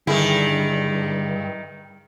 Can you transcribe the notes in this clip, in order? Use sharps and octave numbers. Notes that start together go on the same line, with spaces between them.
G2 D3 D#3 E4 G#4